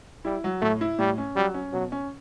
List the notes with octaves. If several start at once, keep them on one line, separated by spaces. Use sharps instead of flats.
G3 E4
F#3
A2 A3
E4
A2 G3
C#4
F#3 G3
C#4
B2 F#3
C#4